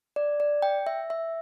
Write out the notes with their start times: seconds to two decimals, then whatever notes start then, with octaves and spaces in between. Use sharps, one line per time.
0.16 D5
0.40 D5
0.62 G5
0.87 E5
1.10 E5